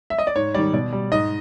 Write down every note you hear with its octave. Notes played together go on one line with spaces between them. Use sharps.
E5
D#5
D5
G#2 C#5
D#3 G3 D5
B2 D5
G3
G#2 D#5